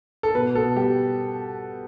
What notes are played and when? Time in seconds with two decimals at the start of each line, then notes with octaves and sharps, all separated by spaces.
0.23 A4
0.35 B2 B4
0.55 B2 A4
0.76 G3 G4